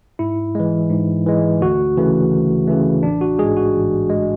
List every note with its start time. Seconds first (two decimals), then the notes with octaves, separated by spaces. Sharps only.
0.19 G#2 E4
0.55 E3 G#3
0.90 G#2
1.26 E3 G#3
1.61 D2 F#4
1.97 C#3 E3 A3
2.33 D2
2.67 C#3 E3 A3
3.03 A1 D4
3.21 F#4
3.39 G#2 G#3 G#4
3.57 F#4
3.75 A1
4.10 G#3